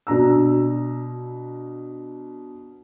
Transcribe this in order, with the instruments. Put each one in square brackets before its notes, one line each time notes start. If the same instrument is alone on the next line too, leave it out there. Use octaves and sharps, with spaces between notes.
[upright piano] B2 D4 A#5 E6